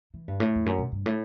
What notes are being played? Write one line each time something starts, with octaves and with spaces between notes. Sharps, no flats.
E3
G2
A2
E2
F#2
B2
G2
A2